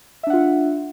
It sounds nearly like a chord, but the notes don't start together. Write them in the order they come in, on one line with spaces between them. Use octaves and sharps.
E5 D4 F#5 F4